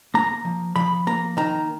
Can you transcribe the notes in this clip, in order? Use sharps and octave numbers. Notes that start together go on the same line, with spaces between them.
A#3 A#5
F3
F3 B5
A#3 A#5
D#3 A#5